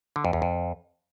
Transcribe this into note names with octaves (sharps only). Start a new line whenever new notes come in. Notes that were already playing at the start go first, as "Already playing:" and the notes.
D3
F2
E2
F2